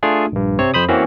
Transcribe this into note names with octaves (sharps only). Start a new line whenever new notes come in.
A3 D4 F4 G#4
A#1 G2
C3 C4 C#5
F2 C5 B5 D#6
E3 A#3 C4 C#4 F#4